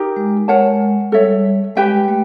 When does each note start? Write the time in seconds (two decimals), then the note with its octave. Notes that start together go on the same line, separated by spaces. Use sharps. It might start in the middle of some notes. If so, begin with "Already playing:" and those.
Already playing: D#4 G4 A#4
0.16 G#3
0.48 G#3 A#4 C#5 F#5 A5
1.12 G3 A4 C#5 E5
1.76 G#3 G4 B4 E5 G5
2.08 A3